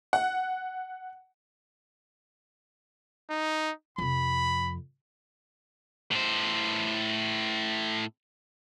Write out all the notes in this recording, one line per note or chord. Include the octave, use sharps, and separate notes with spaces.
F#5
D#4
F2 C3 B5
A2 C5